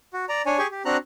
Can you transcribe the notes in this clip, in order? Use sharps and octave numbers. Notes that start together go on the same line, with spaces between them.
F#4
D5 A#5
D4 C#5 G#5
G4 G#4 G#5 C#6
G4
C4 D4 F#4 A#5 F#6